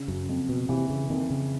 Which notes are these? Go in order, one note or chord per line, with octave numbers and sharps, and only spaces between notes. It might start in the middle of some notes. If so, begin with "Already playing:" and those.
Already playing: C#3
F#2
F2
B2
C3 E3
C#3
F2 D#3
C#3